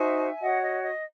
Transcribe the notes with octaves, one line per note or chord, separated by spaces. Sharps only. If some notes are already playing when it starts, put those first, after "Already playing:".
Already playing: D#4 F#4 C5 E5 G#5
F#4 C#5 D#5 F#5
D#5
D#5